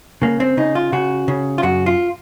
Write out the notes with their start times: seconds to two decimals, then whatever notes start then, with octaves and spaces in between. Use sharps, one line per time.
0.22 C#3 A#3
0.40 C4
0.57 C#3 D#4
0.75 F4
0.92 C#3 F#4
1.28 C#3
1.58 F4
1.63 F#2 F#4
1.86 F4